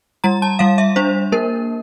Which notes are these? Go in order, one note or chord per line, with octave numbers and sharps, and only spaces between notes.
G3 A#5
A5
G3 F5
E5
D4 C5
A#3 A#4